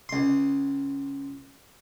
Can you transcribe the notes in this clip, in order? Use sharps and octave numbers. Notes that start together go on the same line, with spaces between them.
C#2 C6